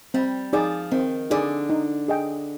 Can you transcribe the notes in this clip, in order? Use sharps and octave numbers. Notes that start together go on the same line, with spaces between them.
G3 C4
F3 D#4 G#4 D5
D#3 C4
D3 D#4 G#4 D5
D#4
G#4 D#5 G5